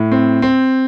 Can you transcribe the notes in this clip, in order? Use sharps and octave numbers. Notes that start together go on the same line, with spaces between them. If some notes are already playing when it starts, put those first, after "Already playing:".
Already playing: A2
C4
C4